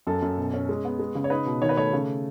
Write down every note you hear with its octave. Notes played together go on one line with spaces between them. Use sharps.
F#2 A4
F#2
B2
C#4
G#3
B3
G#3
C#3
C#5
D#4 B4
B2
D#3 C#5
B4
A3 C#5
C#3